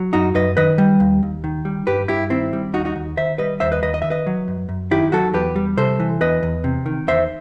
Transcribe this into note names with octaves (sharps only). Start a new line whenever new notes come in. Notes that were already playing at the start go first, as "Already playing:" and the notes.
Already playing: F#3
F#2 D#4 F#4
F#2 B4 D#5
D#3 B4 D#5
G3
D#2
D#2
D#3
G3
G2 G4 B4
G2 E4 G4
D#3 C4 E4
G3
D#2 D#4 F#4
D#4 F#4
D#2
D#3 C5 E5
G3 B4 D#5
D#2 C5 E5
B4 D#5
D#2 B4 D#5
D#5
D#3 E5
B4 D#5
F#3
F#2
F#2
D#3 E4 G4
F#3 F#4 A4
E2 G4 B4
G3
C3 A4 C5
E3
E2 B4 D#5
E2
C3
D#3
E2 C5 E5